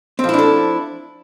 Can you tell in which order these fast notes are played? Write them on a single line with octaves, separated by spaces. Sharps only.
C4 F3 E4 D4 A4